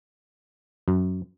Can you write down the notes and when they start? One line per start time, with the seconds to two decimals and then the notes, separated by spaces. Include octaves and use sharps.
0.88 F#2